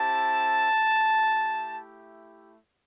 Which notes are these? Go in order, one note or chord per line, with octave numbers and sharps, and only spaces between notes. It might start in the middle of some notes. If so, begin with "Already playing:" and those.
Already playing: C4 E4 G4 A5
A3 E4 G4